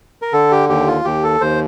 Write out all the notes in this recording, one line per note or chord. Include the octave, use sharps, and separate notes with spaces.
A#4
D3 A4
G4
D#2 G4
F4
D#2 G4
A4
D#2 C5